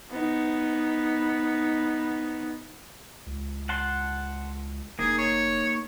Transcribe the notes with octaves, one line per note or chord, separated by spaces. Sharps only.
B3 D#4
C#2
F#5 A5 C6
F1 A#3 D#4 G#4
C#5